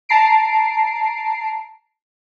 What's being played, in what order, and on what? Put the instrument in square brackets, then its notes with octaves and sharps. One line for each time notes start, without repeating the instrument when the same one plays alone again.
[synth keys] A5 A#5 C7 D7